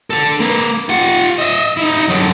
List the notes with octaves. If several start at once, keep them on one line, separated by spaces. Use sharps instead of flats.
D3 A4
A#3 B4
F4 F#5
D#5 E5
D#4 E4
F#2 D3